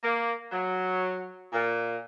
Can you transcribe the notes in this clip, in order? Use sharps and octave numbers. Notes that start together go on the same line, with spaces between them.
A#3
F#3
A#2